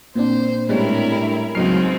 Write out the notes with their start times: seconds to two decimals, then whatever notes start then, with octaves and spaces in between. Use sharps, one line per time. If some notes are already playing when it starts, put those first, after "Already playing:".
0.16 A#2 C4 D4 C5
0.69 A2 G3 G#3 C#4 E4 A#4
1.55 C#2 F#3 G#3 C4 D#4 F6 C7